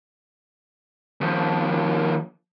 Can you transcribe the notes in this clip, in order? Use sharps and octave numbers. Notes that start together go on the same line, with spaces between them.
D#2 F3